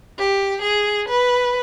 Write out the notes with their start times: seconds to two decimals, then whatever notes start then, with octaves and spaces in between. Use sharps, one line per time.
0.18 G4
0.61 G#4
1.08 B4